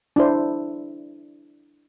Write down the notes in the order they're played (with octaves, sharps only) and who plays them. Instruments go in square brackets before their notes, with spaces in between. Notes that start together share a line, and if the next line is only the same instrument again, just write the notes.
[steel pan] D4 E4 C5